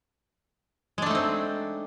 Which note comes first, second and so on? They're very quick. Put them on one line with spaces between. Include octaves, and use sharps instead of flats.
G#3 D4 A3 D#4 C4